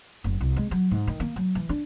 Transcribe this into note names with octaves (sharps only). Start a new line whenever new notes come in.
F#1
C2
G#3
F#3
G#2
D#3
A#3
F#3
E3
D4